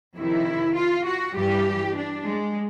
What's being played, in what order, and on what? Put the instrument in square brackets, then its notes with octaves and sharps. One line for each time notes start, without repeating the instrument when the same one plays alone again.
[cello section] F2 C3 D#3 E4
F4
F#4
G2 E3 G3 G4
D4
G#3